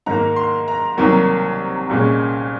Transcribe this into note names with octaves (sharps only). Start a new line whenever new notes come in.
G#2 D#3 A#3 A#5
C6
A#5
C2 C3 D#3 F#3 A#3
C2 A#2 G#3 C#4